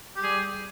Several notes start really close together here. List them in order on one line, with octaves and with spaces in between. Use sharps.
G4 G3 G#4